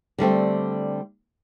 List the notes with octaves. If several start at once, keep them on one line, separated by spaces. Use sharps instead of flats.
D3 G3 A3 C4